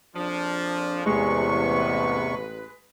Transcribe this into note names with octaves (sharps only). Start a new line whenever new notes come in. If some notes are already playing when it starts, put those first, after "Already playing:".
A#1 F2 F3 D4
A1 E2 C3 G#3 B4 C#6